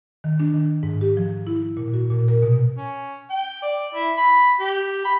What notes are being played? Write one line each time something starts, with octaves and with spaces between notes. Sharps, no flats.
D#3
D4
D#3
G#2
G4
F3
E4
A#2
F#4
A#2
A#4
B2
C#4
G5
D5
E4
B5
G4
B5